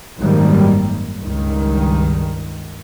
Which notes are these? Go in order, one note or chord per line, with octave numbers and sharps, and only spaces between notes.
G#1 F#2 D#3 G3 A#3
C#2 G2 D#3